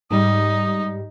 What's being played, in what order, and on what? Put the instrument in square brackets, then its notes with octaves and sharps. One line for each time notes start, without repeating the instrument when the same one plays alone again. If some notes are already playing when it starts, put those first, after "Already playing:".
[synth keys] G#2 G3 [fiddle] D#4 [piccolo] D#6